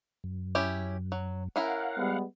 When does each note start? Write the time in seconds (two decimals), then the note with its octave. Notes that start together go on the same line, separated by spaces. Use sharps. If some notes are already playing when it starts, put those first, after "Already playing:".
0.24 F#2
0.55 C#4 E4 G4
1.12 F#3
1.56 C#4 E4 A#4 F5 F#5
1.98 G3 G#3 B3